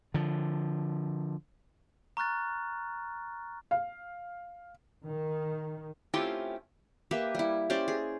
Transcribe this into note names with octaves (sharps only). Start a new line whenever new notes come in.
D3 F3
A#5 C#6 F6 F#6 A6
F5
D#3
A3 C4 C#4 E4 F4 G4
A#3 G4 B4 E5
G3 E4
C#4 G4 C5 D5
G#4